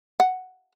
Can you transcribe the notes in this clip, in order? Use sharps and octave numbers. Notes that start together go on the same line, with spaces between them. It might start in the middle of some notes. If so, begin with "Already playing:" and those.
F#5